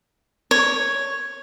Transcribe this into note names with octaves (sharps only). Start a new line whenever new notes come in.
C#5